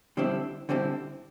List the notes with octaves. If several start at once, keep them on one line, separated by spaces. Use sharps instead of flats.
D3 G3 C4 E4
D3 G3 C4 E4